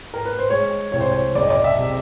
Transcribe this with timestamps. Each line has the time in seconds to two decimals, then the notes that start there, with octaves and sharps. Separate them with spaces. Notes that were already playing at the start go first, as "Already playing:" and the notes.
0.14 A#4
0.25 B4
0.39 C5
0.50 G#3 C#5
0.92 C2 C#5
1.00 C5
1.09 C#5
1.35 F#1 D5
1.43 D#5
1.50 D5
1.64 E5
1.78 C3